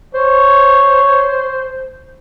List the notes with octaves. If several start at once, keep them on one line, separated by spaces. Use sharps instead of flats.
C5 C#5